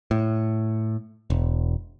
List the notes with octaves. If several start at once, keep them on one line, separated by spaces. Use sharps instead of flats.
A2
E1